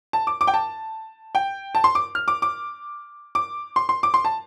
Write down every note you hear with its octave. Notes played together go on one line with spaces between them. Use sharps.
A5
D6
D6
G5
A5
G5
A5
C6
D6
F6
D6
D6
D6
C6
C6
D6
C6
A5